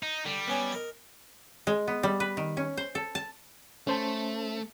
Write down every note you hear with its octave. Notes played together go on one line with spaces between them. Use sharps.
D#4
D3 G3
B3 C#4 G#5
A#4 D#5
G#3
B3
G3
B4
D#3
C#4
C5
A4
A5
A3 C#4 C5 A5